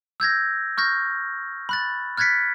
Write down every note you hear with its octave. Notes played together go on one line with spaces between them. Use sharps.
E6 G6 G#6 A#6
C#6 F6 G6 A#6
B5 F#6 A6
F6 F#6 G#6 A6 B6 C#7